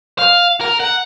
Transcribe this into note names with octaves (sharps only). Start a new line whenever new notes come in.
F5
A#4
F#5